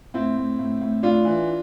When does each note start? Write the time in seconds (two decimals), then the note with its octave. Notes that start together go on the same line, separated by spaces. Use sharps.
0.14 A2 C4 E4
0.37 A2
0.59 A2
0.81 A2
1.03 A2 D4 F4
1.25 E3